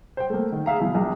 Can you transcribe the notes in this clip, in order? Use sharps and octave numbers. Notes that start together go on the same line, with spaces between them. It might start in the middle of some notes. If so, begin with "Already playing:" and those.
C5 G5
A3 A#3
D#3
G#4 E5 F5 A#5
B2 E3
A#1